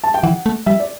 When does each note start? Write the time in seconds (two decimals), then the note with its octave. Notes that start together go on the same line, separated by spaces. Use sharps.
0.04 A5
0.14 G5
0.23 E3 F#5
0.46 A3
0.66 G3 E5
0.80 D5